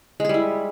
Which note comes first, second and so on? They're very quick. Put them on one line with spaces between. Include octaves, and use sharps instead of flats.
G#3 G#4 G3 E4